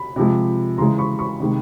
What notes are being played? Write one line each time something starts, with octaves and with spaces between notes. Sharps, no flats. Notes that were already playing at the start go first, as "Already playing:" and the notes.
Already playing: B5
C3 F3 G#3
C#3 E3 G#3 A#5 C6
B5 C#6
B5 C#6
C3 D#3 G#3